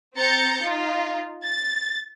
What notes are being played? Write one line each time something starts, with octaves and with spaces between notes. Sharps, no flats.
C4 A#5 G6 A6 C#7
D#4 F4
A6